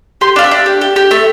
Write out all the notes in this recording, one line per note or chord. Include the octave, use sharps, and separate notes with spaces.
G4 C6
D4 F5
E5
D4
G4
G4
G4
A3 E5